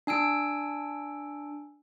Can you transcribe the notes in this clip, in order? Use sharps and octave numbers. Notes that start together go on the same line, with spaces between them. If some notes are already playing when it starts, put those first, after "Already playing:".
D4 G#5 E6 D7